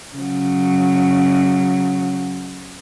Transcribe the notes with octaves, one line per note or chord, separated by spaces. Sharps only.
C#3 F#3